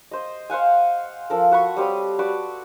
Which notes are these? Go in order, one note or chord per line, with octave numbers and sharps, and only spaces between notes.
C5 D#5
C5 F5 F#5 G#5
F3 A4 A#4
F#4 F#5 B5 C#6
G3 C4 C#5 D#6
F#4 B4 D5